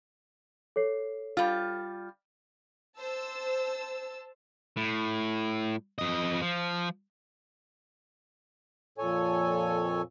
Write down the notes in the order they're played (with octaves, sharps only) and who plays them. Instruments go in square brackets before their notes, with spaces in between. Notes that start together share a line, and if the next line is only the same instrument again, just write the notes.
[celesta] A4 C#5 C7
[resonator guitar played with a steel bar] G3 F4
[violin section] C5 A5 E6
[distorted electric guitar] A2
F2 D#5
F3
[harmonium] F2 A#2 A4 C#5 G#5